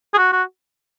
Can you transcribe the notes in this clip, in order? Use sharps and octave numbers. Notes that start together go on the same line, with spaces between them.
G#4
F#4
F#4